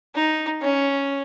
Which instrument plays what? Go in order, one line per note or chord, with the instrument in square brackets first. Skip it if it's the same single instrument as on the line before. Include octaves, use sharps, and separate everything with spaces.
[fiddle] D#4
C#4